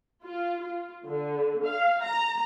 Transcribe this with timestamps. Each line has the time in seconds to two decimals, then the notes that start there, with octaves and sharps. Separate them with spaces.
0.23 F4
0.62 F4
1.07 D3
1.66 F5
2.03 A#5